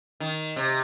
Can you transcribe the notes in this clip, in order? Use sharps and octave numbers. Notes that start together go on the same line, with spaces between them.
D#3
C3